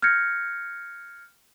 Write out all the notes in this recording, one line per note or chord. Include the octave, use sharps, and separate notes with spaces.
F6 G6 G#6 A#6 C#7